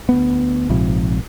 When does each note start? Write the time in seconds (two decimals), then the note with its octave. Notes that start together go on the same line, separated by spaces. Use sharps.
0.09 D2 B3
0.69 A#1 G#2 C3 F3